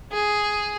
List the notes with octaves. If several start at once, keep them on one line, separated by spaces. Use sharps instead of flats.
G#4